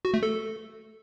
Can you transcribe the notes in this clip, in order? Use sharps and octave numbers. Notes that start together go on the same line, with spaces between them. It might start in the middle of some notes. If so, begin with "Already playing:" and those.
F#4
A3
A4